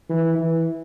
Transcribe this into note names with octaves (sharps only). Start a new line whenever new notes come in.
E3
E3